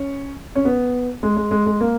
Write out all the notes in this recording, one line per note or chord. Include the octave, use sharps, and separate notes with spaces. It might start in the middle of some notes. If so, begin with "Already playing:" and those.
Already playing: C#4
C#4
B3
G#3
G#3
G#3
G#3
A#3